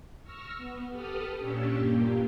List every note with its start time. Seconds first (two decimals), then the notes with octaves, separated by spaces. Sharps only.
0.23 C#6 E6 F6 A#6
0.57 B3
0.90 G4 A4 B4 D#6 F6
1.39 A#2 C#4 D4 G4 C#6 E6
1.76 G2 A#2 A#3 G4